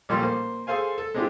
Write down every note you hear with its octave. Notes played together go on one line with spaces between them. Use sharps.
A1 A#2 F3 G3 A4 C6
A#3 C5
G#4 A4 C5 F5 G#5
A4
G#3 C4 D4 E4 F4 G4